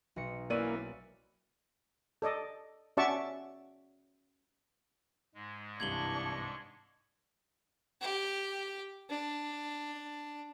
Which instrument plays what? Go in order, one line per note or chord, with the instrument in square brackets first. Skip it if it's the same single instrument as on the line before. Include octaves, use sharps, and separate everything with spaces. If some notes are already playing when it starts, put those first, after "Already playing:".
[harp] B1 D#5 C#7
[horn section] E3 C#4 [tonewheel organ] A#3 [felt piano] D5 D#7
[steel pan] A4 D5 D#5
C#4 F#4 D5 E5 A5 C#6
[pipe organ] G#2 G#3
[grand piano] C2 G2 E3 [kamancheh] D4 C#6 [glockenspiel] G#6 F#7 G7
[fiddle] G4
D4